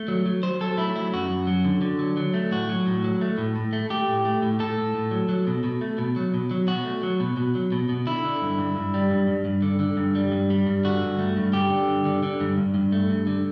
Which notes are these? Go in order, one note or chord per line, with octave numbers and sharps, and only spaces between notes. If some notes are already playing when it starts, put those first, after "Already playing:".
Already playing: A3
F#3
F#3
F#3 C5
F#3 A4
A3 E4
F#3 E4
F#2 F#4
F#2
F#3
D3
D3
F#3
F#3
A3
A2 F#4
F#3
A2
F#3
A3
A2
A2
A3
A3 G4
A2
A3
A2
A2 A4
A2
A2
F#3
F#3
B2
B2
A3
B2
F#3
B2
F#3
B2 F#4
A3
F#3
B2
B2
F#3
B2
B2
D3 E4
D3
G2
G2
G2
G3
G2
G2
G2
D3
D3
G2
G3
G2
G3
G2
D3 F#4
G2
A3
G2
D3 G4
D3
G2
D3
D3
G2
G2
G2
A3
G2
D3